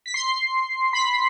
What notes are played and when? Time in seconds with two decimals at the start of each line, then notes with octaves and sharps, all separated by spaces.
0.06 B6
0.14 C6 C7
0.93 B5 B6